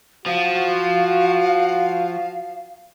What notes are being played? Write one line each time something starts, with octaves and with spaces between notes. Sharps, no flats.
F3 F#4 F5